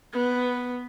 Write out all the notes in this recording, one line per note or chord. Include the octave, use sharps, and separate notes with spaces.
B3